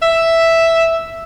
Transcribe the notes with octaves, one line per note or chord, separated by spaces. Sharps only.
E5